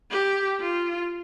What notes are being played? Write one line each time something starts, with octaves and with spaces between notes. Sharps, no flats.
G4
F4